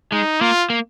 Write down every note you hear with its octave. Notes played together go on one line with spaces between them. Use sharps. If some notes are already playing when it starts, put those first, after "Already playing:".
G#3 D#4
A#3 F4
A#3